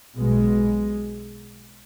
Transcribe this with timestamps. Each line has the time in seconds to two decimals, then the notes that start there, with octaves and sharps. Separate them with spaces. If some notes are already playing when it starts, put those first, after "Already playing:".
0.17 B1 B2 G#3